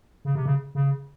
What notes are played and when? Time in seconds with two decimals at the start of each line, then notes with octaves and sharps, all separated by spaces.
0.25 C#3
0.35 C3
0.46 C#3
0.75 C#3